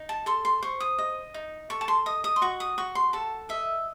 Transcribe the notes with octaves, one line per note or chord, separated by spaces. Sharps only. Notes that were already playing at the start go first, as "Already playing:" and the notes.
Already playing: D#4
A5
A4 C6
C6
C5 C#6
D#6
D#5
D#4
A4 C#6
A5
C6
D#5 D#6
D#6
C6
F#4 C#6
D#6
F#4 C#6
C6
A4 A5
D#5 E5